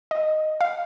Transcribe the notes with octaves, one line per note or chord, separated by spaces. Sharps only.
D#5
F5